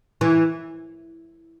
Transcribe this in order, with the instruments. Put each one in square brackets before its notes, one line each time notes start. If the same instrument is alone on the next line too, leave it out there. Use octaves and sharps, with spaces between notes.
[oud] E3